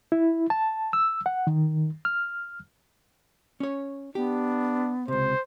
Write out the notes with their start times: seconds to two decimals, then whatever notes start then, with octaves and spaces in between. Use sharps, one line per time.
0.12 E4
0.50 A5
0.93 E6
1.26 F#5
1.47 D#3
2.05 F6
3.60 C#4 C#5
4.15 B3 D4 G4
5.08 C#2 C3 C5